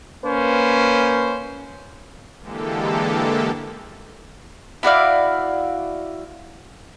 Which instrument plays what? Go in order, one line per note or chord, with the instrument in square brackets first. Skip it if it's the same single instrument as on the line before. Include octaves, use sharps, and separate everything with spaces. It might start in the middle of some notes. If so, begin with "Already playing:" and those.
[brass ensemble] A#3 C#4 B4 C5
[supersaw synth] D3 E3 G#3 A#3 G4 A4
[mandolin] E4 F#4 D5 F5